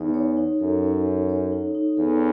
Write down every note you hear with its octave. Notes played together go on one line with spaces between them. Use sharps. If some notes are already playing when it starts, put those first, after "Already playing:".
Already playing: E2 D#4
C#5
D#4
F#2 A4
C#5
D#4
C#5
D#4
D#4
E2 A4